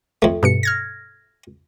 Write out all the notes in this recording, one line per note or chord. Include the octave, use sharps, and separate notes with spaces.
F2 A3
G2 B2 C#7
F6 G#6 A#6